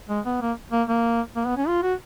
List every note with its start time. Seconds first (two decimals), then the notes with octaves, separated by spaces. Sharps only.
0.09 G#3
0.25 B3
0.41 A#3
0.72 A#3
0.88 A#3
1.36 A#3
1.46 B3
1.57 C#4
1.68 F4
1.83 F#4